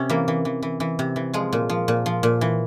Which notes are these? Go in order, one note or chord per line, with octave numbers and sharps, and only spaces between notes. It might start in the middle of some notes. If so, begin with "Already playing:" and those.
Already playing: C3 C#4
E3 A#3
E3
E3
E3
E3
C3
E3
F3 G#3
A#2
F3
A#2
F3
A#2
E3